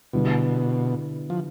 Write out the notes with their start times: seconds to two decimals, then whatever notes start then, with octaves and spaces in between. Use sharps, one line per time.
0.13 B2 D3 G3 B3 E4
1.30 F3